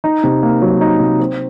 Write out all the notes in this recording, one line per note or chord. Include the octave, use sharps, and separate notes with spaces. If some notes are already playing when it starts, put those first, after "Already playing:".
D#4
C3
A#3
F#3
D#4
C3
C4